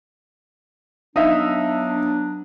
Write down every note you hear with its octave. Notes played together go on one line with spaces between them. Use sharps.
F#3 B3 D4 D#4 E5 F5